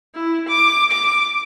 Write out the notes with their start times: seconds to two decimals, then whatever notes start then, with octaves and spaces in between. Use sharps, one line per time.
0.15 E4
0.48 D6
0.91 D6